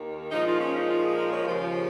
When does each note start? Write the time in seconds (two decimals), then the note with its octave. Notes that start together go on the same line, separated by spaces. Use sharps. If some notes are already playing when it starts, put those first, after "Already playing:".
Already playing: D#2 D#3
0.30 A#2 F3 G#3 D#4
0.45 F4
0.58 C#4
0.73 D#4
0.87 F4
1.02 G#4
1.16 A#4
1.31 C#5
1.44 D#2 C#3 F3 G#3